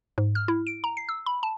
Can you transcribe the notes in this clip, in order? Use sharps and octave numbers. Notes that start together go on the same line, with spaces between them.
G#2
F6
E4
D7
A#5
C7
E6
B5
A5